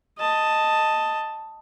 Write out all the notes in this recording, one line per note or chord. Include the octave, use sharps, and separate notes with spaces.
D#5 A5